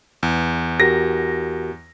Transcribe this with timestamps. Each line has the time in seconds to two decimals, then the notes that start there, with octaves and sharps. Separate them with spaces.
0.23 E2
0.80 F#4 G4 A#4 A#6